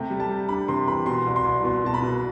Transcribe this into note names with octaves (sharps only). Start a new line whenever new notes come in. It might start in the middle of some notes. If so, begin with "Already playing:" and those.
Already playing: C3 A3 G5
G3
A5
G3
D4 B5
C3 C6
E3 B5
B2 C6
C2
C6
C2
B2 C6
B2 A5
B5
B2